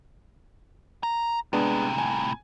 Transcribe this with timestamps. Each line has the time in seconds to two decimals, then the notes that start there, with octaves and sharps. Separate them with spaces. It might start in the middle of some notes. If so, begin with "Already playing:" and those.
1.03 A#5
1.53 A2 C3 G#3 B3 D4
1.98 G#5